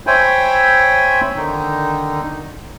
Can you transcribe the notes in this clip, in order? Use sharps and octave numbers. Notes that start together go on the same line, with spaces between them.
C5 C#5 E5 G5 G#5 B5
D3 D#3 D#4